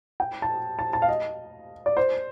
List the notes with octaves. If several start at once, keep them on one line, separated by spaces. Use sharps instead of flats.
G5
A5
A5
A5
F5
D#5
D5
C5